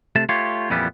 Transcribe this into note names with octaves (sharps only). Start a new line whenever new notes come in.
C3 A3 A5
A3 F4 G4 C#5
F2 A#2 E3 G3 B3